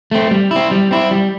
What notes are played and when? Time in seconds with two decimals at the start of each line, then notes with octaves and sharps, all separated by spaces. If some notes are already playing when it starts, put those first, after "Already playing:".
0.11 A3 C4
0.31 G3
0.51 C4 E4
0.71 G3
0.91 C4 E4
1.11 G3